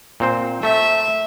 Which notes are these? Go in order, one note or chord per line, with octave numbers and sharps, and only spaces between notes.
A#2 C4 C5
A3 E5